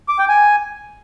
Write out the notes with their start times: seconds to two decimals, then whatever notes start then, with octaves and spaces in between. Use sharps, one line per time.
0.09 D6
0.19 G5
0.29 G#5